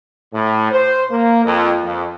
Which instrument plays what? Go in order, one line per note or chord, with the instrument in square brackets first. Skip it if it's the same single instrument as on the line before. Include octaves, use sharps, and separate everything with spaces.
[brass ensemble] A2
C5
A#3
F2
F2